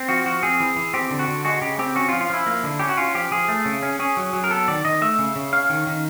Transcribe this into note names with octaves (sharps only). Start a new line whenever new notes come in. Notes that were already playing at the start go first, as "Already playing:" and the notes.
Already playing: C4
F3 F#4
F3 F#4
C4 G#4
E3
E3
C4 G4
D3
F#4
D3
G#3 F#4
C#3 G4
C4 G4
C#4 F#4
F4
F3
F4
F3 E4
A#3
D3
C#4 G4
F#4
C#4 F4
F3 G4
F3 G#4
A3
C#3
C#4
C#4 G#4
F#3
F#3
A#4
B3 A4
D#3 D5
D#3 D#5
A3 E5
C#3
C#3
C#4 F5
D#3
D#3